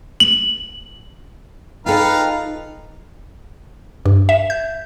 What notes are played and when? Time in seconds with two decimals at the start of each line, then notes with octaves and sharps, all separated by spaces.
0.20 F#7
1.86 D#4 F4 A4 B4 F5 G5 A#5
4.06 G2
4.29 E5
4.50 G6